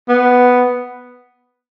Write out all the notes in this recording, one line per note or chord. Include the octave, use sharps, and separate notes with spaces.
B3